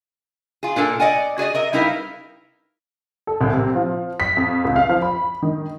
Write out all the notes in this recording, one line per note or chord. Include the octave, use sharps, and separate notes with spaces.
F4 G#4
A#2 D4 A4 A#4 G#5
D5 D#5 F#5 G#5
F#4 G#4 D5 D#5
A#4 D#5 E5
G3 D#4 E4 A#4 B4 F5
A4
C2
C3
F3
B6
F2
C#2
F5
F3
B5
D#3